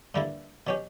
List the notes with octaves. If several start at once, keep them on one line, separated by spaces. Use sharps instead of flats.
G2 D3 G3 A#3 E4
B2 F#3 C#4 G4